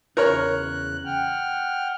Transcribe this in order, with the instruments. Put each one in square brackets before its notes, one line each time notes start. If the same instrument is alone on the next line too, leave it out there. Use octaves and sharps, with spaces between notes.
[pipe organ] E2 C#3 F#6 [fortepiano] A#4 C#5
[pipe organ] F#5 G5 F6